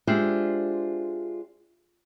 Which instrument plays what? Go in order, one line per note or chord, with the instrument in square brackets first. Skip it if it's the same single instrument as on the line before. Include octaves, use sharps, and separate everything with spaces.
[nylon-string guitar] G#3 D4 F4 G4 C5 E5